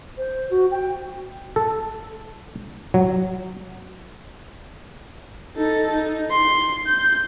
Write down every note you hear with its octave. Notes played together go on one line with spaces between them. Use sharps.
C5
F#4
G5
A4
F#3
D#4 A4
D#4
C6
G6